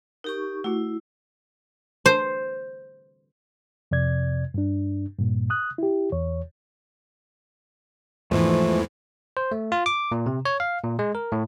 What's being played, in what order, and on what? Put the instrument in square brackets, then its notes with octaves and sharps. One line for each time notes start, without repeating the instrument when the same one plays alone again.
[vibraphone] D#4 G4 C#6 [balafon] A#4
[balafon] A3 F#4 [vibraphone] E4
[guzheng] C5
[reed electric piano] F2 C3 D5 G#6
G2 D4
G2 A#2
D#6 F#6
E4 G4
E2 C#5
[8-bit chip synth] E2 G#2 E3 [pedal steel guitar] F3 A3
[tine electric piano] C5
A3
F4
D6
A#2
C3
C#5
F5
A#2
G#3
A#4
A2